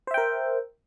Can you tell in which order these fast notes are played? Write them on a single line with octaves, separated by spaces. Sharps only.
C5 E5 G5 A#4